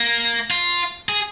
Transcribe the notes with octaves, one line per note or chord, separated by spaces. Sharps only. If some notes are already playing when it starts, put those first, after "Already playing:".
Already playing: A#3
F4
G#4